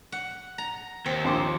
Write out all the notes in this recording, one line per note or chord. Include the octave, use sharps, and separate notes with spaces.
F#5
A#5
D#2 C4
A#1 C6 D6